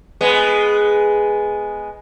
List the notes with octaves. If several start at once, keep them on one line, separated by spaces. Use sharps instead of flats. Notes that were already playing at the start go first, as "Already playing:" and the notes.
G#3 B3